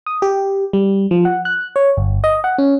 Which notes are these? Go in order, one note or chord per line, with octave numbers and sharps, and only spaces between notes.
D#6
G4
G3
F3
F#5
F#6
C#5
G1
D#5
F#5
C#4